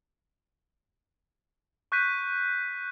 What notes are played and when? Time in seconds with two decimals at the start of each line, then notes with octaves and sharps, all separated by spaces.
1.92 C#6 F#6 G6 B6 D#7